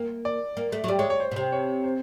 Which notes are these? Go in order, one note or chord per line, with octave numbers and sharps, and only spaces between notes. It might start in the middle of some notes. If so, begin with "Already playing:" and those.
Already playing: A#3
D5
A#3
A3
F#3
G3 D5
G#3 C#5
C#5
C5
B2
C3 C5
C#5
C5